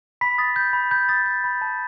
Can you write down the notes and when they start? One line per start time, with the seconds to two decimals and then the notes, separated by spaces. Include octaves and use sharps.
0.21 B5 B6
0.38 D#6 A6
0.56 G6
0.73 B5
0.91 B5 G6
1.09 D#6 A6
1.26 G6
1.44 B5
1.61 A5